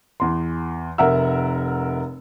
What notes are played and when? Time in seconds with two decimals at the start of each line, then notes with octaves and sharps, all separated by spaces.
0.20 E2 C6
0.98 F1 A#4 E5 F#5 A#5 E6